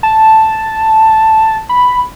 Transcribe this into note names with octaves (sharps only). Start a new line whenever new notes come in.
A5
B5